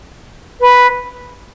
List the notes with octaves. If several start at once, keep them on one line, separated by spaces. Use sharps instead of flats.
B4